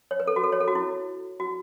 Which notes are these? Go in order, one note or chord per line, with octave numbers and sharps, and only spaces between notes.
C#5
B4
A4
F#4
A4
C#5
A4
F#4
E4
F#4